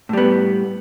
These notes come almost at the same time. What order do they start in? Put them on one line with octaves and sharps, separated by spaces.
A2 G3 B3